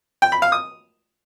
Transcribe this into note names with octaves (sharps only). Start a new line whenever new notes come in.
G5
B5
F5
D#6